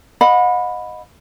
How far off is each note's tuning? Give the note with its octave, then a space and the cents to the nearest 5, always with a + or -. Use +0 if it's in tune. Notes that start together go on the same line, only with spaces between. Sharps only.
D#5 +0 F#5 -40 B5 +0